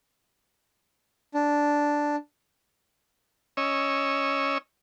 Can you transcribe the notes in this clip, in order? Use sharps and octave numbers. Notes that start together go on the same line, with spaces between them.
D4
C#4 C#5 D#5 E6